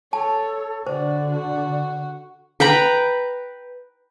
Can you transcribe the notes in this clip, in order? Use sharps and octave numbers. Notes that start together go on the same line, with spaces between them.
A4 C#5 A5
D3 F#4 C5 D5
F#4
B4 G5 A#5 B5